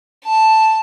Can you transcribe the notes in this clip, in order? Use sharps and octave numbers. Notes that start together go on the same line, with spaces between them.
A5